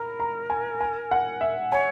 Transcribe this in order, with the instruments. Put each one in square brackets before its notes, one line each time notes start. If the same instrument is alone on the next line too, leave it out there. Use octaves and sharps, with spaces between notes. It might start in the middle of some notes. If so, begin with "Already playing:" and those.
Already playing: [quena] A#4 [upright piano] A#5 B5
[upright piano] A#5
G#5
G#5
F#5
E5
[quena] C#5 [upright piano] G#5